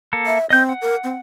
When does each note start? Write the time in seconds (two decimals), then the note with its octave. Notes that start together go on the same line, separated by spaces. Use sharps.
0.13 A#3 A4
0.27 E5
0.50 C4 D#5 G6
0.69 F#5
0.82 A#4
1.04 C4